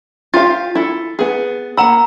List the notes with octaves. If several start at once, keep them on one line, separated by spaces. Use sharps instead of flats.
F4 G4 F5 A6
E4 A4
B3 G#4
A#3 F#5 A#5 B5 E6